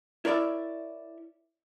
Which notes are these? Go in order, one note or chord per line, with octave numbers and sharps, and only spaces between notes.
E4 A#4 C#5 D5 E5